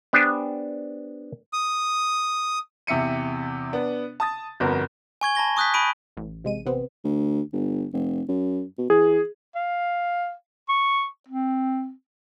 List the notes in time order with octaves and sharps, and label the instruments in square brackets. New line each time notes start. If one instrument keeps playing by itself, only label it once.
[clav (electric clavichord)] B3 D4 G4 C5 G#5
[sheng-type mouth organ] D#6
[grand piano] E2 C3 E5 C#7 D#7
B3 D4
A5 D#6 A6
G1 F2 B3 F#4 A#4
[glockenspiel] G#5 C#6 G#6 G7
A5 B5 A#6 G7
C#6 D#6 F#6 G6 B6
B5 D#6 D7 D#7
[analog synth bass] A1
[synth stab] C3 G#3 D#7
C3 B3 C4
[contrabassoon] D2
G1
F1
F#2
B2
[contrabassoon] E3 [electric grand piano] G#4
[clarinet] F5
C#6
C4